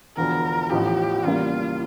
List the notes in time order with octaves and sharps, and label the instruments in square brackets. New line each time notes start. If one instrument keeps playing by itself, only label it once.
[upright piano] E1 D2 D3 F3 [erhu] A#4
[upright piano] A1 A2 F3 [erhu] G4
[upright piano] E2 C#3 G3 A#3 [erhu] F4